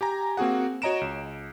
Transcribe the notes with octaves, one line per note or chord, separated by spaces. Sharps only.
G4 G#5 A#5
A#3 C4 F#4 G#4 F#5
F#4 C#5 D#5 A#5 D7 E7
C#2